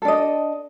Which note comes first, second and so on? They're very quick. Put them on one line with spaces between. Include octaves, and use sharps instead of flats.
A4 D4 D#5